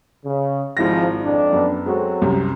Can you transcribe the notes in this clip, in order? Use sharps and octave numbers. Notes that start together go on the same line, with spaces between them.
C#3
G#1 G#2 F3 E4 A#6
F2 D4
F#2 B3
F#3 G#3 C4 F#4 A4
C2 F#2 C3